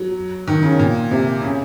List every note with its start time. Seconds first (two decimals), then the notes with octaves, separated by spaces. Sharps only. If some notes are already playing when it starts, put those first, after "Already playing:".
Already playing: F#3
0.48 D#3
0.63 C#3
0.79 A#2
1.11 C3
1.42 C#3